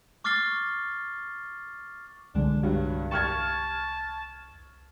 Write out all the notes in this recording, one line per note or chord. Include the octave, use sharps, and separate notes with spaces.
C#6 D6 F6 A6 C7 G7
C2 D3 G#3 D4
G2 F#3
A5 C#6 F6 G#6